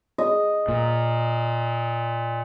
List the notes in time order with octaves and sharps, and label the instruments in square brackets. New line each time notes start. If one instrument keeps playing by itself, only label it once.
[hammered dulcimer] D#5
[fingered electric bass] A#2